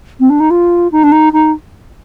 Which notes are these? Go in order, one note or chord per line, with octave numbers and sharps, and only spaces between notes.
C4
D4
D#4
F4
D#4
D4
D#4
D#4